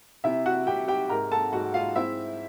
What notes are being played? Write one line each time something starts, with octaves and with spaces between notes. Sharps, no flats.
C3 E4 E5
F#4 F#5
C3 G4 G5
G4 G5
G#2 A#4 A#5
A4 A5
G#2 F#4 F#5
F4 F5
C4 E4 E5